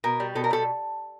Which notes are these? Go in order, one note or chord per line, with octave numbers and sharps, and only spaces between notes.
B2 A#4
G3
B2 A4
A#4
G3 A4